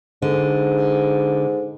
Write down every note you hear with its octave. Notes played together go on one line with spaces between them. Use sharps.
G#2 D3